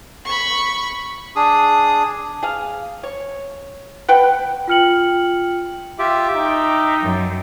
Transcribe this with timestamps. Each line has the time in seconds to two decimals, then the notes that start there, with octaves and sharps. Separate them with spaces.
0.25 B5 C#6
1.36 D4 G#4 D#6
2.43 G#4 F5
3.03 C#5
4.08 B4 F#5 G5
4.68 F4 G5 F6 C#7 F#7
5.99 F4 G4 E5 D6
6.35 D#4 G5
7.03 F#2